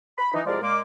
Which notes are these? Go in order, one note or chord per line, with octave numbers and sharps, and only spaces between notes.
B5
E3 D#4
C2 F3 G#3 G#4 A#4 D5
A#2 G#3 A#3 D6